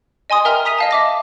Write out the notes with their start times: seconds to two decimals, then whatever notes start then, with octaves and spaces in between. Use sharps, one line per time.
0.30 D#5 G#5 C6 D#6
0.45 A#4 E5 G5 A#5 F6
0.65 A#5 D#6 B6 D#7 F7
0.78 D#5 F5 A5
0.91 E5 D6 A#6